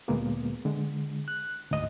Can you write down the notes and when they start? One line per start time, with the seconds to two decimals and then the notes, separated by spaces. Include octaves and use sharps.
0.08 D2 A#2 G#3 A#3 B3
0.65 D3 G#3
1.28 F#6
1.71 D2 G#2 D#5